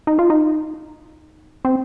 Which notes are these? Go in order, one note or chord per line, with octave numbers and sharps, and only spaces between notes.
D#4
F4
D#4
C4